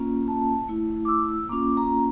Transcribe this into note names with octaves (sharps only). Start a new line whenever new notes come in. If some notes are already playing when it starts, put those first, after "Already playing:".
Already playing: A#3 C#4 F4
A5
A3 E4
D6
E6
A#3 C#4 F4 D6
A#5